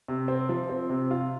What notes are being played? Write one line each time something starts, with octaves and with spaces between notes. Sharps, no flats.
C3
C4
F3
C4
C3
F4